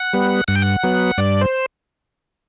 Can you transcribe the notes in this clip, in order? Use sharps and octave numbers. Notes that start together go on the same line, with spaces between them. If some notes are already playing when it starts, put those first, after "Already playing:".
Already playing: F#5
G3 B3
G2 F#5
G5
F#5
F#3 B3
G2 D5
C5